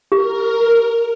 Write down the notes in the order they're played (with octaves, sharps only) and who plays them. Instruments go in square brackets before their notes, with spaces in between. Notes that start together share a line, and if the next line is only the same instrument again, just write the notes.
[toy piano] G4 [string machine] A#4